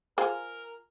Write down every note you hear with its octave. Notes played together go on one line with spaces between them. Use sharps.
F4 G#4 A#4 C5